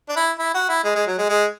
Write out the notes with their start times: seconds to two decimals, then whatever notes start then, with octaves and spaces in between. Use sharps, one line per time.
0.09 D4
0.16 E4
0.39 E4
0.54 F#4
0.69 E4
0.84 G#3
0.95 G#3
1.07 F#3
1.18 G#3
1.29 G#3